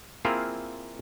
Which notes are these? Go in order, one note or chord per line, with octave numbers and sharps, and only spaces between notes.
A#3 C4 E4 F4 G#4 A#4